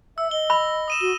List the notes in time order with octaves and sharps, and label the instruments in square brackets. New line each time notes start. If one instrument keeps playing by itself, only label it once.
[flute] E5 [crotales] E6
[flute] D#5 [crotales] G7
[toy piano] B5 [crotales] A#6
[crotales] D#6 D#7 E7
[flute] F#4 [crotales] G7